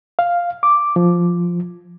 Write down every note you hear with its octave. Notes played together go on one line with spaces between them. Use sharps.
F5
D6
F3